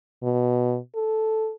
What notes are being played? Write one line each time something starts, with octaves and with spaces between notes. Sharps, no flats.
B2
A4